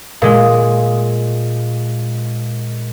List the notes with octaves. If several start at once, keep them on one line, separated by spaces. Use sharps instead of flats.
A#2 G#3